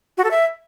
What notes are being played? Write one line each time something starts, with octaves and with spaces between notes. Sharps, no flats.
F#4
A4
E5